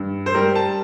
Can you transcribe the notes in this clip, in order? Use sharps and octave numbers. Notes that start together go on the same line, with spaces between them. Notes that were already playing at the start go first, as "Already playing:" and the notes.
Already playing: G2
C5
G3 A#4
A5